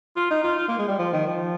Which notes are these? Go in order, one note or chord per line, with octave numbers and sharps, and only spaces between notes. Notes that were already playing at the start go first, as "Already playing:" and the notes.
F4
D#4
F4
F4
A#3
G#3
G3
F3
D#3
F3